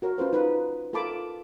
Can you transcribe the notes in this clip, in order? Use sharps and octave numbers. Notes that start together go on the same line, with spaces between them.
F#4 A#4 C#5
C#4 F4 B4 C5
D#4 F4 B4
F4 A4 A#4 A5 B5 D6